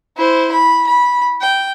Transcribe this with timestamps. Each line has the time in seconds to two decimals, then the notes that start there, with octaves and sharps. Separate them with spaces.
0.17 E4 C5
0.52 B5
0.87 B5
1.41 G5